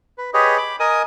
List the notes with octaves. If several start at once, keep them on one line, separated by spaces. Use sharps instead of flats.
B4
G4 G#4 B4 C#5 D#5
B5 D6
A#4 D#5 G#5 D#6